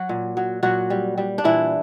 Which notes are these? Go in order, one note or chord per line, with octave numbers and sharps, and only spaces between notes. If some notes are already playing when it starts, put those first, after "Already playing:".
Already playing: F#3 F#4
A#2
F#3
A#2 F#3 F#4
G3
G3
D4
A#2 E3 E4